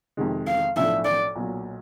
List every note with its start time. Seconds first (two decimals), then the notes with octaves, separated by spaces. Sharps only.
0.17 F2 C3 D#3 G#3
0.47 F5
0.77 B1 A2 F3 A3 D4 E5
1.05 D5
1.36 B1 A#2 F#3